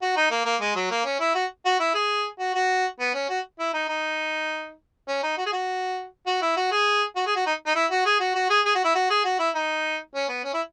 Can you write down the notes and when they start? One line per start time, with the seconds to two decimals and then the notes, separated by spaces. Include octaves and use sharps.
0.02 F#4
0.16 D#4
0.31 A#3
0.45 A#3
0.61 G#3
0.76 F#3
0.91 A#3
1.05 C#4
1.20 E4
1.35 F#4
1.65 F#4
1.80 E4
1.94 G#4
2.39 F#4
2.55 F#4
3.00 B3
3.14 C#4
3.29 F#4
3.59 E4
3.73 D#4
3.88 D#4
5.08 C#4
5.23 D#4
5.37 F#4
5.46 G#4
5.52 F#4
6.26 F#4
6.42 E4
6.57 F#4
6.71 G#4
7.16 F#4
7.26 G#4
7.36 F#4
7.46 D#4
7.66 D#4
7.75 E4
7.91 F#4
8.06 G#4
8.20 F#4
8.35 F#4
8.50 G#4
8.66 G#4
8.75 F#4
8.84 E4
8.95 F#4
9.10 G#4
9.24 F#4
9.39 E4
9.55 D#4
10.15 C#4
10.29 B3
10.44 C#4
10.54 E4